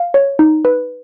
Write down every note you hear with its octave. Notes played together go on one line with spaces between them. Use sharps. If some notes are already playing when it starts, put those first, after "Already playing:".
Already playing: F5
C#5
D#4
B4